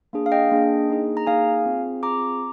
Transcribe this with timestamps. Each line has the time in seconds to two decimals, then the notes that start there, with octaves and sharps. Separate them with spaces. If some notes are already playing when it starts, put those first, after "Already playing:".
0.13 A#3 D4 G#4
0.26 F5
0.32 D#5 G5
0.52 A#3 D4 G#4
0.90 A#3 D#4 G#4
1.17 A#5
1.27 A#3 D#4 G#4 F5 G#5
1.65 C4 F4 G#4
2.03 C4 F4 G#4 A#5 D6